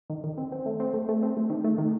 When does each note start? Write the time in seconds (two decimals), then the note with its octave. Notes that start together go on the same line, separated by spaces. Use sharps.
0.10 D#3
0.24 D#3
0.38 C4
0.52 C4
0.66 A3
0.80 C4
0.94 A3
1.09 A3
1.23 C4
1.37 A3
1.50 D#3
1.64 A3
1.78 D#3